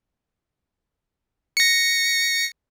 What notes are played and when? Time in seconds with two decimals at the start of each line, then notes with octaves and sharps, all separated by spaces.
1.57 A#6 C#7